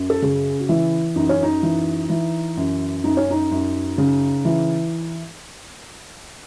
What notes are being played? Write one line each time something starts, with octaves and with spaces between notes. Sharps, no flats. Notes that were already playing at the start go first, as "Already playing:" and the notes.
Already playing: F#2
A4
C#3 G#4
F#4
E3 E4
F#2 D#4
C#4
D#4
E3
E3
F#2
F#2 D#4
C#4
D#4
F#2
C#3
E3